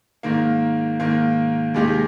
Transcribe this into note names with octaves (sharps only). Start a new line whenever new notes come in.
G#2 D#3 A#3
G#2 D#3 A#3
D#2 D#3 G#3 D#4 G4